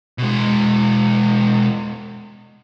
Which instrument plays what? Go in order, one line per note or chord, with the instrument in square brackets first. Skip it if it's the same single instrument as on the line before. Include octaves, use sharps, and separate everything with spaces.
[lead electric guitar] B2 G#3